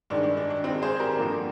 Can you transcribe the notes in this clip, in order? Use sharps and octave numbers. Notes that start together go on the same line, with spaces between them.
G2 D#3 G#3 D4
D4
D4
D4
G2 D#3 G#3 C4 D#4
G#4 C5
G4 A#4
G2 D3 F3 A#3